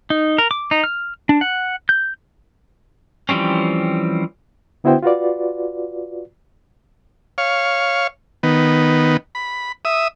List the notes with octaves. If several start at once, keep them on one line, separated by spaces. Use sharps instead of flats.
D#4
A#4
D6
D#4
F6
D4
F#5
G6
E3 F3 G3 C4 C#4
D3 B3 E4 F#4 C5 G5
F4 F#4 B4 D5
C#5 F5
D#3 B3
B5
E5 D#6